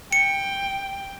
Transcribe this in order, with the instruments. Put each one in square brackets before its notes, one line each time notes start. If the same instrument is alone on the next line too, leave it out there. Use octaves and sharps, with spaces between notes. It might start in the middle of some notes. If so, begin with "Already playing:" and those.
[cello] G5 [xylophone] C#7